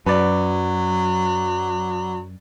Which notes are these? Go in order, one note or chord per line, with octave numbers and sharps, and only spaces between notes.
F#2 F#3 B4 D5